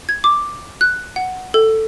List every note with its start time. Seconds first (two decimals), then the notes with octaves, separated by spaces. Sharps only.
0.09 G#6
0.24 D6
0.81 F#6
1.16 F#5
1.54 A4